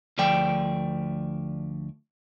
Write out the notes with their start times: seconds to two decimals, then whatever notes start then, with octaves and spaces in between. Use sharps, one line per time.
0.18 D2 F3 A3 D5 G5